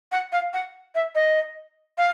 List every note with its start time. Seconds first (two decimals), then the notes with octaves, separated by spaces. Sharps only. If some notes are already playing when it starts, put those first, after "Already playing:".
0.11 F#5
0.32 F5
0.53 F#5
0.94 E5
1.15 D#5
1.97 F5